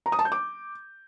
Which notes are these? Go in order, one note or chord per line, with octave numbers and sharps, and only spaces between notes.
A#5
D#6
A5
G6
D6